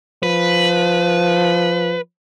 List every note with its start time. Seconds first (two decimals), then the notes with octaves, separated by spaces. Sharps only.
0.23 F3 B4